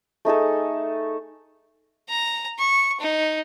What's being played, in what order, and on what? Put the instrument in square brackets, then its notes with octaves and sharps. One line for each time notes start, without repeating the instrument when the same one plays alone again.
[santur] A3 D#4 G#4 A4
[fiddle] A#5
C#6
D#4